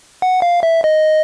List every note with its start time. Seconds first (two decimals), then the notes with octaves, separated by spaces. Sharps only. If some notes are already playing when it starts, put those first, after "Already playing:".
0.22 F#5
0.42 F5
0.63 E5
0.84 D#5